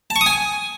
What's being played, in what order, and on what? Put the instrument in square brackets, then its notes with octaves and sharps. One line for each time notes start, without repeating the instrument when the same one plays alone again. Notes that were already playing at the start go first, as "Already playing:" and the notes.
[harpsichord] A5
C#6
D#6
G#5